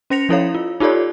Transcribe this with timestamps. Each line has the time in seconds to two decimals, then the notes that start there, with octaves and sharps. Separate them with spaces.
0.10 C#4 C5 A#6 C#7 F7
0.29 F3 C#4 E4 A4 C#5 F5
0.55 F4
0.80 D#4 F4 G4 A4 C#5 D5